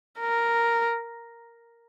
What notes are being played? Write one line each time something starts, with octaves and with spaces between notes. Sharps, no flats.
A#4